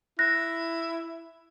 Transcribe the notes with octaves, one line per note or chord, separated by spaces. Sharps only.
E4 F#6 A#6